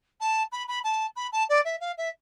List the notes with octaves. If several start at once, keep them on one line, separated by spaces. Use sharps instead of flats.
A5
B5
B5
A5
B5
A5
D5
E5
F5
E5